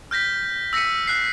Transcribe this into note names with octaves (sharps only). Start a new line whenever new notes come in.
F6 G6 A#6 B6
E6 A#6 B6 C#7 D#7
F#6 C7